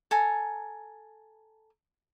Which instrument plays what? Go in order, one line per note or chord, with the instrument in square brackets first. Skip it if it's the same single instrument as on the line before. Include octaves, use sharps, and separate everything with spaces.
[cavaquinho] A4 G#5 A#5